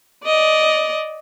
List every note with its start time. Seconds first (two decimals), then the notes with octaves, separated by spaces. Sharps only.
0.25 D5 D#5